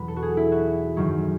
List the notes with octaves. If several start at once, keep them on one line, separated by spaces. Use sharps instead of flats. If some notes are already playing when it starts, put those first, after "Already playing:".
Already playing: E2 B2 F#3 B4
A4
F#4
G#4
E4
F#4
F#2 D#3 F#3